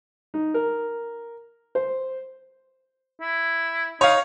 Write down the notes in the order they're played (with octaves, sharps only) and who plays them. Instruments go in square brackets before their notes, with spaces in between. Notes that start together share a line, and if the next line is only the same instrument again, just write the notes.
[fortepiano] D#4
A#4
C5
[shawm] E4
[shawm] D#4 [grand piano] C#5 F5